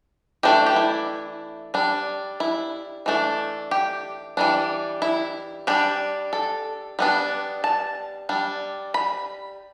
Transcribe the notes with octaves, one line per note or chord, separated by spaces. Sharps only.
E3 A3 D4 G4
G4
E4
G3 D4
E4
E3 A3 D4
G4
E3 G3 D4
E4
G3 D4 G4
A4
G3 B3 D4
A5
G3 D4
B5